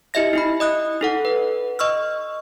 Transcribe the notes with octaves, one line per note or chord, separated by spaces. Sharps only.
E4 G4 D#5 E5 A#6
D#4 E4 B5
D#5 D#6 F#6
D#4 A4 F#5
B4
D#5 C#6 E6 F6